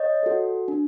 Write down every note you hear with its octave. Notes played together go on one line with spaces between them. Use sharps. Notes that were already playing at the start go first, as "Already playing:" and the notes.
Already playing: C#5 D#5
F#4 A4
D4